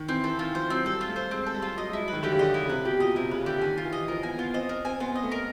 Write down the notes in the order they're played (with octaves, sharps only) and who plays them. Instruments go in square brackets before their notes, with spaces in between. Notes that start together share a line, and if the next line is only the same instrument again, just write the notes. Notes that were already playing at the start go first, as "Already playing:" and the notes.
Already playing: [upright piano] D#3
[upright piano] E3 [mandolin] C4
[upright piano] E3 [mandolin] A4
[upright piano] D#3 [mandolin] F4
[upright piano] F3 [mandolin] C5
[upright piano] F#3 [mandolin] C4
[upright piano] G3 [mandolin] A4
[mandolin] F4
[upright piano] A3
[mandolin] C5
[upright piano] G#3 [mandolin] C4
[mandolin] A4
[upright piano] G3
[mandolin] F4
[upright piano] F#3 [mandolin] D#5
[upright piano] G#3 [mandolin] E4
[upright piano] F#3
[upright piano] D#3 [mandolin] B4
[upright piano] D3 [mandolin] G4
[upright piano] C#3
[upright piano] D3 [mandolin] D#5
[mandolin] E4
[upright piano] C#3
[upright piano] C3 [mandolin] B4
[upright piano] B2 [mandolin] G4
[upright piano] A#2 [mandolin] D#5
[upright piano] C3 [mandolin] E4
[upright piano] C#3 [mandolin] B4
[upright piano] D3 [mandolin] G4
[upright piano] D#3 [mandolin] G#5
[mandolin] F4
[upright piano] E3
[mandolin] D#5
[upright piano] F3 [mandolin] A#4
[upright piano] B3 [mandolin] G#5
[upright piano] B3 [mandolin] F4
[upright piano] C4 [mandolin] D#5
[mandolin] A#4
[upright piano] C4 [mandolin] G#5
[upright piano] B3 [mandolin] F4
[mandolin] D#5
[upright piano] A3
[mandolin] A#4